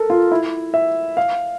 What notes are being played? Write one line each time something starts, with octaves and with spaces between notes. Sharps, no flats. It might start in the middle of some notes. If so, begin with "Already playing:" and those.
Already playing: A4 A#4
F4
E4
E5
F5